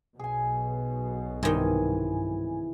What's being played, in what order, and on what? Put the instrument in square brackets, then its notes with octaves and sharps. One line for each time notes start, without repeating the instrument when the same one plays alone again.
[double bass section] B1 B2 [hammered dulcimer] G#4 G#5
[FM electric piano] G2 G#5 [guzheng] C3 D#3 [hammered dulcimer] E3